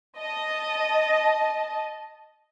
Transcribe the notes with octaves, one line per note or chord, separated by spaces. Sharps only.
D#5 A5